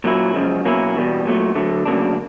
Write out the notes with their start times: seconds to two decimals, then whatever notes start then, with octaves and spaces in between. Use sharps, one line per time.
0.04 A#2 F#3 A#3 C#4 E4
0.34 F#2 C#3 F3 G#3
0.65 B2 F#3 A#3 C#4 E4
0.95 E2 B2 G3
1.25 A#2 F#3 A3
1.55 D3 F#3 A3
1.86 D2 C#3 F#3 A#3 D4